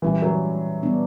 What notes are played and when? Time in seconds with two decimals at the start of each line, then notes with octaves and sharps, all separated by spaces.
0.02 A#2 E3 G3 C#4 G4
0.22 F#3
0.83 G3 B3 D4